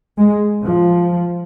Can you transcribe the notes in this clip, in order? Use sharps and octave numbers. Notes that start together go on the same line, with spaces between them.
G#3
F3